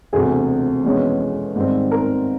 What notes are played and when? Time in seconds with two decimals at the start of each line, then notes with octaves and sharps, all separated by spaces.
0.13 E1 D2 C3 G#4
0.84 F1 E2 B2 G#3 C#4
1.56 G#2 D#3 G3 C4
1.91 A#4